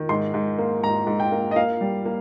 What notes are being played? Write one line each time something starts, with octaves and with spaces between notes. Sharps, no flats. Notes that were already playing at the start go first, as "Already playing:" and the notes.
Already playing: D#3
G#2 C6
G#2
A#3
G#2 A#5
G#2
G5
A#3
D#5
A#3 F5
G3
A#3